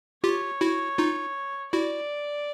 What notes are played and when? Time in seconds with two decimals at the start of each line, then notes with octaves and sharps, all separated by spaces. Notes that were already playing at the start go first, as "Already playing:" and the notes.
0.24 F4 G4 C#5
0.61 E4 F#4
0.98 D#4 F4
1.73 E4 F#4 D5